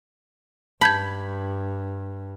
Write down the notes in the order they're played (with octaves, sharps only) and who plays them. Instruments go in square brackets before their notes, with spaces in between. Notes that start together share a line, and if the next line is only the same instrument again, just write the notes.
[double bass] G2 [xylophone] A5 G6 G#6 [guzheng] B5